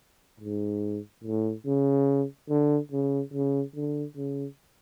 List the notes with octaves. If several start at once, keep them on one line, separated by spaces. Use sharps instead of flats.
G#2
A2
C#3
D3
C#3
C#3
D3
C#3